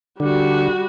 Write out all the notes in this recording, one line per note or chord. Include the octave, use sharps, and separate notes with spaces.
D3 G3 F#4